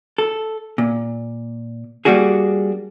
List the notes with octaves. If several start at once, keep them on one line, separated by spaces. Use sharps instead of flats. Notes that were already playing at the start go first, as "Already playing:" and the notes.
A4
A#2
G3 A#3 D4 F#4 G#4